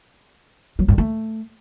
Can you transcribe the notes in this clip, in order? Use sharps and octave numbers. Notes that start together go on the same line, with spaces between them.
F#3
G2
A3